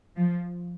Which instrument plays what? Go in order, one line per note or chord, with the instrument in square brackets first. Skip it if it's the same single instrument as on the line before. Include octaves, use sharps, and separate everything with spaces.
[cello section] F3